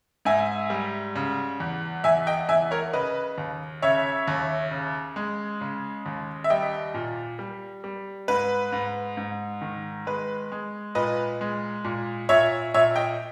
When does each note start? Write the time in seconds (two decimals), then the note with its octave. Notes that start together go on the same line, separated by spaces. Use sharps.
0.25 G#2 E5 G#5
0.70 G3
1.16 C#3
1.60 E2
2.04 E2 E5 G#5
2.27 D#5 G5
2.49 E2 E5 G#5
2.71 A#4 C#5
2.93 C#3 B4 D#5
3.38 D#2
3.82 C#3 C#5 E5
4.28 D#2
4.71 C#3
5.16 G#3
5.61 C#3
6.06 D#2
6.44 E5
6.50 G3 D#5 G5
6.94 A#2
7.39 G3
7.84 G3
8.28 G#2 B4
8.73 G#2
9.17 G#2
9.61 D#3
10.07 G#3 B4
10.52 G#3
10.95 A#2 B4 D#5
11.41 G#3
11.85 A#2
12.29 A#2 C#5 E5
12.74 A#2 C#5 E5
12.96 D#5 G5